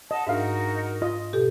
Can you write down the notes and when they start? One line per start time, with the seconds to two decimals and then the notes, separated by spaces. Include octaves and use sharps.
0.11 D#5 F#5 A5
0.27 G#2 D4 D#4 F#4 A#4 E5 F5
1.02 F4 D#5
1.33 B2 G4 A4